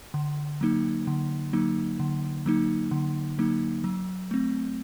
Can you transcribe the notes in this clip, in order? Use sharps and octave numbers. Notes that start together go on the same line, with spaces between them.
D3
F#3 A#3 D#4
D3
F#3 A#3 D#4
D3
F#3 A#3 D#4
D3
F#3 A#3 D#4
F#3
A3 C4